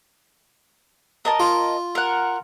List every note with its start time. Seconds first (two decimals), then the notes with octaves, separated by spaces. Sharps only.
1.25 A#4 D#5 A5
1.40 F4
1.95 A#4 F#5